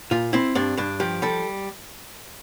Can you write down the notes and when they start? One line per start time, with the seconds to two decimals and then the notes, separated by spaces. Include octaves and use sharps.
0.11 A#2 F4
0.33 C4 E4
0.55 G2 D4
0.77 G2 D4
1.00 F3 G4
1.22 G3 A4